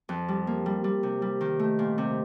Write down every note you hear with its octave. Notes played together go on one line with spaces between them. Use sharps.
F2
G3
A#3
G3
G3
C3
G3
D#3
A3
A#2
C3